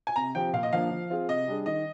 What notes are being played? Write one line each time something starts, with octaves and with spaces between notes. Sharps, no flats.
G#5
C3 A#5
F3 C4 G4 G5
A#2 F5
D#5
F3 A#3 D4 F5
F3
C4 F4 G#4
C3 D#5
G3 D4 G#4
D#3 D#5